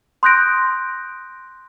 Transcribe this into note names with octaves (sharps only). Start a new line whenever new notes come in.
C6 D#6 F#6 G6 A#6 D7